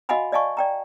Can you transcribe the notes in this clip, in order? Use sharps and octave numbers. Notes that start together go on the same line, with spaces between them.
F#4 D#5 F5 F#5 G#5 B5
D5 D#5 F5 G#5 A5 C#6
D5 G5 A#5